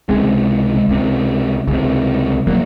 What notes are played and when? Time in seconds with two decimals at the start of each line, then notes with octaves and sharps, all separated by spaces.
0.09 C#2 C3 G#3 C4
0.88 C#2 C3
1.68 C#2
1.73 C3
2.47 F#3 A#3